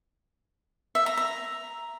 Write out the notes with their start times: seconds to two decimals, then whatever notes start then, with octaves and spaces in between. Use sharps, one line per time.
0.95 E5
1.06 A#5
1.17 A#5